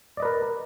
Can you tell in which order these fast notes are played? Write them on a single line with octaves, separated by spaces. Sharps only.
D5 D#5 B4 A#4